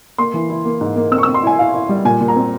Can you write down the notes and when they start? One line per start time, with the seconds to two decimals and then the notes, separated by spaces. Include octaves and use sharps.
0.18 A#3 C6
0.34 E3
0.50 E4
0.65 A#3
0.81 G#2
0.96 A#3
1.12 C4 E6
1.18 C#6
1.23 E6
1.27 C4
1.34 C6
1.43 E4 G#5
1.59 E4 F5
1.74 E4
1.89 G3
2.05 A#2 G#5
2.21 A#2
2.28 A#5
2.36 C4